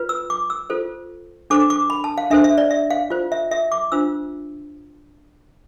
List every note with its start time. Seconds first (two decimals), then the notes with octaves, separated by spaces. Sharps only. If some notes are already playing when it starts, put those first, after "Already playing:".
Already playing: F4 B4
0.09 E6
0.30 D6
0.50 E6
0.70 F4 A4 C5
1.50 D4 A4 C5 D6
1.70 D6
1.90 B5
2.04 A5
2.18 F5
2.30 D4 A4 C5 E5
2.44 E5
2.58 D5
2.71 E5
2.90 F5
3.10 F4 C5
3.32 E5
3.52 E5
3.72 D6
3.92 D4 F4 C5 E6